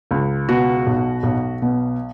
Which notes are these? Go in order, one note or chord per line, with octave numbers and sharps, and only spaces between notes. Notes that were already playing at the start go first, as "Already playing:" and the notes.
C#2
B2 F#4
B1
B1
B2